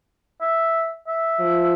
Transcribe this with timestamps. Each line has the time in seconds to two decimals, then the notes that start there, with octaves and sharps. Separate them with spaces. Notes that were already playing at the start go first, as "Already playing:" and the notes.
0.41 E5
1.07 E5
1.40 F3